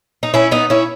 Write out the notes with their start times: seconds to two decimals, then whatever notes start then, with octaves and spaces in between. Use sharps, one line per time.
0.23 D#4
0.34 C#4 E4
0.51 B3 D#4
0.70 C#4 E4